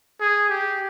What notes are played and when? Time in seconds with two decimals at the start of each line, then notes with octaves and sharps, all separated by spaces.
0.21 G#4
0.49 G4